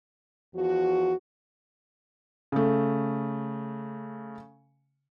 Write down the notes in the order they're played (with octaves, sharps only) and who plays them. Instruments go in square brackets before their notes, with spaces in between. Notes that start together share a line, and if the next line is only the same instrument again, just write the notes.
[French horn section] E2 F3 F#4
[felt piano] C#3 A3